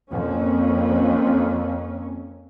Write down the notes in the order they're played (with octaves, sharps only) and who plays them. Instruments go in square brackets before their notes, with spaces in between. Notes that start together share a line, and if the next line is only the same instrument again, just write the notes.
[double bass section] F2 A#3 C#4